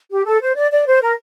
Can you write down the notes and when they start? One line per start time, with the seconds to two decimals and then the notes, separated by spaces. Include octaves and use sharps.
0.11 G4
0.26 A4
0.41 C5
0.56 D5
0.71 D5
0.87 C5
1.02 A#4